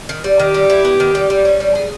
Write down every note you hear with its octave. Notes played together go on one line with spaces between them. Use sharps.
D#3
G3
D#3 G4
G3
E4
B3
D#3
G3
G3
C#4
G3
G#4